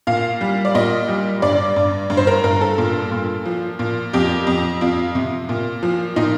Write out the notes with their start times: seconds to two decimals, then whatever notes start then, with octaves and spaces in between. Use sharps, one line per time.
0.07 A#2 F5
0.41 G3
0.65 D5
0.75 A#2 D#5
1.08 G3
1.42 G2 D5
1.76 G2
2.10 G2
2.17 C5
2.27 A#4
2.44 G2 A#4
2.61 A4
2.78 A#2
3.12 A#2
3.45 F3
3.79 A#2
4.13 F2 G4
4.47 F2
4.81 F2 F4
5.15 C3
5.49 A#2
5.83 F3
6.16 A#2 D#4